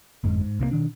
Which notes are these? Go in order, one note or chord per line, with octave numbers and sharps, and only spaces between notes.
G1 F2 G#2 G#3
G#2
C2 C3 D#3 A#3
B2 D#3 D4